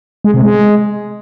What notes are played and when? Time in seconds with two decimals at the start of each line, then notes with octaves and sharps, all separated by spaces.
0.24 G#3
0.34 C3
0.44 G#3